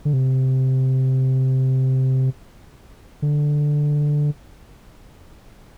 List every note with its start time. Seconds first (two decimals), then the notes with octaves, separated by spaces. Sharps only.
0.05 D3
0.13 C3
3.22 D3